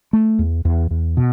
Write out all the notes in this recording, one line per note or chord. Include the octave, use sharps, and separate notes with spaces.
A3
E2
E2
E2
B2